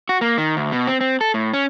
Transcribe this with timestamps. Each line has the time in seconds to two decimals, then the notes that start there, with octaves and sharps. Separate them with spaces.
0.09 F#4
0.21 A#3
0.38 D#3
0.57 D2
0.72 B2
0.87 C4
1.01 C4
1.21 A4
1.34 A2
1.54 C#4